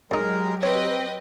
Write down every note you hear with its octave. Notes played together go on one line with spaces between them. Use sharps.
F#2 F#3 G#3 D#4 G4 A#4
C4 B4 C#5 D#5 G5